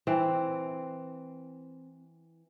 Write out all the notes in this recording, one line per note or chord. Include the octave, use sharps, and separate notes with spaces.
E3 C4